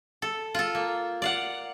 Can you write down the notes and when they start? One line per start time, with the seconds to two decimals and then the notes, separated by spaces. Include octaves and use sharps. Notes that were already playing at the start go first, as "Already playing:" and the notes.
0.22 A4
0.54 F4 A4
0.75 A#3
1.22 D5 F5 F#5